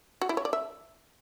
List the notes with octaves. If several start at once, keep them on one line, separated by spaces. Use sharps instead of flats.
F#4
E4
C#5
D5
E5